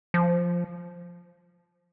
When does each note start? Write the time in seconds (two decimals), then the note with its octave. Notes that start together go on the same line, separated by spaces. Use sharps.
0.14 F3